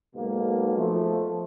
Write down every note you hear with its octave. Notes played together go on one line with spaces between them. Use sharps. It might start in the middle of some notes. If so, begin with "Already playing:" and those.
B1 G#2 B2 A#3
F3 A3